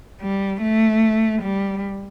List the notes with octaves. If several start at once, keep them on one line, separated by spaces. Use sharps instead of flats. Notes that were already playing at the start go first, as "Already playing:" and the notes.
G3
A3
G3